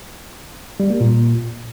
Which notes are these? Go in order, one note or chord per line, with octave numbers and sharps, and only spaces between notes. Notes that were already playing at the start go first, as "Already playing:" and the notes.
G3
A#3
A#2